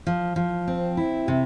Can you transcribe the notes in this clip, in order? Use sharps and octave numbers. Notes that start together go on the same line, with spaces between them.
F3
F3
C4
E4
C3